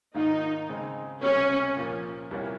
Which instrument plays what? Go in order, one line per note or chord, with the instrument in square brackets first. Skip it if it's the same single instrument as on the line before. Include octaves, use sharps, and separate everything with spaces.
[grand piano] G#2 D#3 A#3 F4 [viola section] D#4
[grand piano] C#3 G#3 C4 D#4
[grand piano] C#2 C3 G3 [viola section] C#4
[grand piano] A#2 F3 A#3
C2 A#2 G3 A#3 C#4